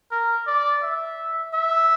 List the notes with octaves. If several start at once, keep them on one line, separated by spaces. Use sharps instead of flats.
A#4
D5
E5
E5